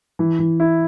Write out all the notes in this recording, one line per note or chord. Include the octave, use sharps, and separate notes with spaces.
E3
E3
E4